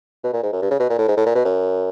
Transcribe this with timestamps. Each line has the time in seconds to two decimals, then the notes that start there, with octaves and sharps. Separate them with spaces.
0.24 B2
0.33 A#2
0.43 G#2
0.53 F#2
0.62 G2
0.71 C#3
0.80 B2
0.90 A#2
0.98 A2
1.08 G#2
1.17 A2
1.26 A#2
1.35 B2
1.45 F#2